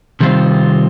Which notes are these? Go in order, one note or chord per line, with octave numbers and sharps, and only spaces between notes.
C3 D#3 G3 C4 F4